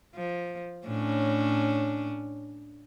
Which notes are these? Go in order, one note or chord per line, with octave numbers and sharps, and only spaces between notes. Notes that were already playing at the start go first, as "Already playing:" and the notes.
F3
A2 C#4 D4